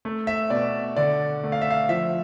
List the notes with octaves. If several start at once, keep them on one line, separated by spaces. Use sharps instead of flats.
A3
E5
B2 D5
D3 D5
A3
F5
E5
F5
F3 E5